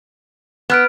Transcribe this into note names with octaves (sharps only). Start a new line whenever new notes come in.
B3 B4 F6 D7